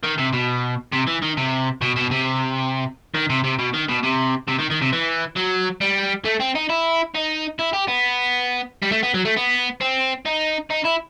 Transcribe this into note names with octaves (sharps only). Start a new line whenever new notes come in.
D#3
C3
B2
C3
E3
D#3
C3
B2
B2
C3
D#3
C3
C3
B2
D#3
B2
C3
C3
D#3
D#3
C3
E3
F#3
G3
A3
C4
D#4
E4
D#4
E4
G4
B3
G3
A3
B3
F#3
A3
B3
C4
D#4
D#4
E4